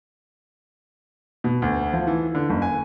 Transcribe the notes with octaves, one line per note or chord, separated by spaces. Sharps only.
B2
D2
F3
E3
D3
F#1
G#5